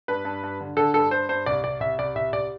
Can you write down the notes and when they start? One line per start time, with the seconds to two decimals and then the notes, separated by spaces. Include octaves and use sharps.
0.08 G2 B4
0.25 G2
0.43 G2
0.61 D3
0.77 D3 A4
0.94 G2 A4
1.11 G2 C5
1.29 G2 C5
1.46 C2 D5
1.64 C2 D5
1.80 C2 E5
1.99 C2 D5
2.15 C2 E5
2.33 C2 D5